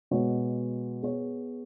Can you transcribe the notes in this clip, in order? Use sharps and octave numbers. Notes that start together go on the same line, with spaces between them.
B2 G#3 B3 F#4 C#5
B3 G#4 C#5